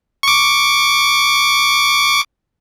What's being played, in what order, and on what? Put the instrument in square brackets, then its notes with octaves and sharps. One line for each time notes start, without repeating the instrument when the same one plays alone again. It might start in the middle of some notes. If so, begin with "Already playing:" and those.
[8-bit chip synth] C#6 D6